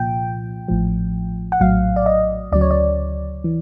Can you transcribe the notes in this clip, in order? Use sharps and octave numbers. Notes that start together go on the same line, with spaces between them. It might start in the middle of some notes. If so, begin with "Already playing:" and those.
Already playing: C2 A#2 F3 G5
A1 A2 F3
F#5
A#1 A2 F#3 F5
D5
D#5
D2 C#3 F#3 D5
C#5
D5
E3